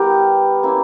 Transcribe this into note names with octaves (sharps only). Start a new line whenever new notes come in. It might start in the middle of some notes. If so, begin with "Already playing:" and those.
Already playing: G3 B3 E4 G4 A#4
A#3 C#4 E4